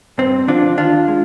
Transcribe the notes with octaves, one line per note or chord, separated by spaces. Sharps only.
G2 C4
D3 F3 D4 F4
D#2 D4 F4
G#3